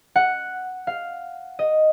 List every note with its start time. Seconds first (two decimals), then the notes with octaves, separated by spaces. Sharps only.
0.16 F#5
0.87 F5
1.59 D#5